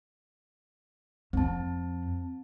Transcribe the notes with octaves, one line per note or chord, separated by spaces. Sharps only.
F2 C4 A5